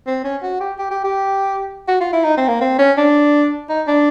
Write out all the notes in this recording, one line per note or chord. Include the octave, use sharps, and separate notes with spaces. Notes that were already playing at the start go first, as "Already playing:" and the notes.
C4
C#4
F#4
G4
G4
G4
G4
F#4
F4
E4
D#4
C4
A#3
C4
C#4
D4
D#4
D4